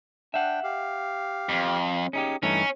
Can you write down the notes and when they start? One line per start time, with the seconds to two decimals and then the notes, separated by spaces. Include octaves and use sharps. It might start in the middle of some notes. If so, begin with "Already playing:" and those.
0.34 D4 E5 F#5 G5
0.64 G4 F5
1.49 F2
2.13 C#4 D#4 G4 G#4
2.43 G2 E3 A3 C#4 D#4